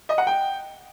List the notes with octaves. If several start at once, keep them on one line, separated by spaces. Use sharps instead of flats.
D#5
F#5
G5